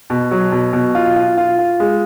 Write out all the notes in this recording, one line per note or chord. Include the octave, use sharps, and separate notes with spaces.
B2
F#3
B2
B2
F4
F4
F4
F4
G#3